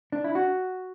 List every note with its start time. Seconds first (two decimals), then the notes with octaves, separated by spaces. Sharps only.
0.12 D4
0.24 E4
0.35 F#4